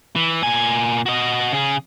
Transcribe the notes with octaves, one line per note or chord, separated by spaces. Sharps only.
E3
A#2 G#5
F#4 D#5
C#3 G#4